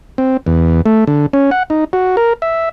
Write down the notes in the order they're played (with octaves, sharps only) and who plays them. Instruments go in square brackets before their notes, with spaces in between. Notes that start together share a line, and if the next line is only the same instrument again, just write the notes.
[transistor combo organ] C4
E2
A3
D3
C#4
F#5
D#4
F#4
A#4
E5